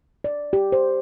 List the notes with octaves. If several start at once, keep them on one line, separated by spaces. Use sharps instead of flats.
D5
G4
C5